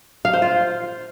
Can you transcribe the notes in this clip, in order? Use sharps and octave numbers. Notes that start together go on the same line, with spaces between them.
F5
C5
F4